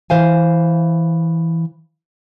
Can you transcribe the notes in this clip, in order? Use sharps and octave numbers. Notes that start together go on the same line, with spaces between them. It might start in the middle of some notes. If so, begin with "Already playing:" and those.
E3 C5 F5 G#5